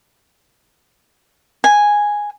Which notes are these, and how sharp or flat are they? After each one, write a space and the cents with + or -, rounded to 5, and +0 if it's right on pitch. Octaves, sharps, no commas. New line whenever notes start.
G#5 -5